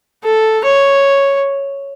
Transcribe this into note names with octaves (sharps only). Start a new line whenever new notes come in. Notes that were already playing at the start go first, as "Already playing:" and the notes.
A4
C#5